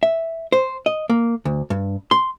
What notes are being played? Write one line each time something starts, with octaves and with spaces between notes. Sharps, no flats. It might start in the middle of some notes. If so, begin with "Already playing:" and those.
E5
C5
D#5
A#3
D2
G2
C6